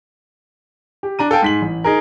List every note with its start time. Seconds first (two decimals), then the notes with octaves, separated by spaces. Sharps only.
1.03 G4
1.19 D4 A#5 D#7
1.31 A4 F5 G5 G#5
1.42 G#2 B6 F#7
1.62 A1
1.84 D#4 G#4 A#4